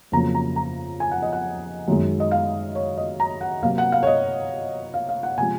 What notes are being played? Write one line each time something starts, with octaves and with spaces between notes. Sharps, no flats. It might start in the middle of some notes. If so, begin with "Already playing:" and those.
F2 C#3 F#3 A#3 A#5
A#5
A#5
G#5
F#5
D#5
F#5
F#2 D#3 G#3
D#5
F5
C#5
D#5
A#5
F#5
C3 F#3 A#3 F5
F#5
F5
C#5
D#5
F5
F5
F#5
C3 F3 G#3 G#5